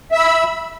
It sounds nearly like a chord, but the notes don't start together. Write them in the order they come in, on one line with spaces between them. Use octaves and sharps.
E5 E6 B5